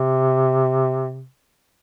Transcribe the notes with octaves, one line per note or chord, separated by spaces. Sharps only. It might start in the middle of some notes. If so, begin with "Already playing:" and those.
Already playing: C3